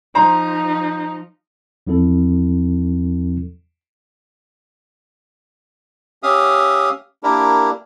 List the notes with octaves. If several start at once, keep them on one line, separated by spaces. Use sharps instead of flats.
F3 D#4 C5 A#5 C6
E2 F3 C4 E4 A4
C#4 G4 E5 F5 D#6
A#3 D4 E4 G4 A#4